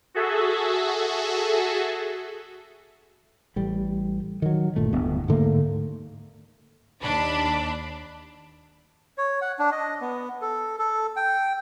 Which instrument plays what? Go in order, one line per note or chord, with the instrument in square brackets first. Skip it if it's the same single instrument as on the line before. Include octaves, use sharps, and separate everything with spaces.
[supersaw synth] F#4 G#4 A4 E5
[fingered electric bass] A1 G3
D#3 F#3
G1 A#2 A3
D1 G2 B3
G#2 D3 A3 A#3
[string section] D#2 D4 B5
[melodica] C#5
F#5
D4
D#5
B3
A4
A4
G5